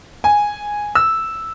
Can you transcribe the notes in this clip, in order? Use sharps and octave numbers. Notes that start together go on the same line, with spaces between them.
G#5
E6